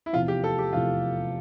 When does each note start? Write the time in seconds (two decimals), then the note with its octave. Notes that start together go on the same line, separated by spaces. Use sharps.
0.06 E4
0.13 F1 E2 C3 F3 F4
0.28 G4
0.44 A4
0.59 G4
0.73 F1 E2 C3 F3 F4